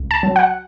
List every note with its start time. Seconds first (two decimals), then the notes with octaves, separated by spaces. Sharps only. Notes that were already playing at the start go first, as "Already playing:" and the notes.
Already playing: C#2
0.11 A5
0.23 F#3
0.36 F#5